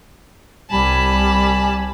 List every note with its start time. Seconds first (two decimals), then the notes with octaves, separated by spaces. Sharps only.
0.70 C2 G3 G#5 A5 B5